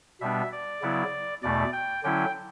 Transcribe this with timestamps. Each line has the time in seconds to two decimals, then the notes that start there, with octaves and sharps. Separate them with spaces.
0.21 B2 G3 B3 D4 E5
0.52 D5
0.82 C#3 F#3 B3 E4
1.43 E2 B2 A3 D5
1.73 G5
2.03 D3 F#3 C#4 E4 G5